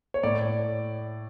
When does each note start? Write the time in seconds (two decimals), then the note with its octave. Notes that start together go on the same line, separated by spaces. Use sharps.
0.14 C#5
0.23 A2 D5